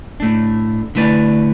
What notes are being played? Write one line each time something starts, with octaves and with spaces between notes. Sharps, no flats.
A2 A3 D4
D3 A3 E4 B4 D5